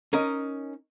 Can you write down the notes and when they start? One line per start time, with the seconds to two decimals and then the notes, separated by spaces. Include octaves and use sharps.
0.13 C#4 D#4 A#4 D#5